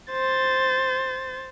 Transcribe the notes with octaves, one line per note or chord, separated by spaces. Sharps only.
C5 A6